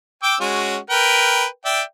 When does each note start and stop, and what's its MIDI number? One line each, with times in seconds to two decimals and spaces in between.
0.23 0.35 79
0.23 0.35 86
0.23 0.35 88
0.40 0.77 56
0.40 0.77 61
0.40 0.77 66
0.90 1.45 70
0.90 1.45 71
0.90 1.45 79
1.65 1.82 74
1.65 1.82 76
1.65 1.82 79